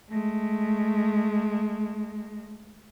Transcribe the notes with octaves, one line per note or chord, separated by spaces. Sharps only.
G#3 A3